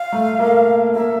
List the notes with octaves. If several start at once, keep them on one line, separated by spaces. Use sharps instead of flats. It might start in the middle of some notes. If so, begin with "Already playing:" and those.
Already playing: F5
A3
A#3
A#3 E5